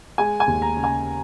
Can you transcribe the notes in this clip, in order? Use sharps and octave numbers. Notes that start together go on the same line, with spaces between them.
G#3 G#5
G#5
D#2
A#5
C#3
G#5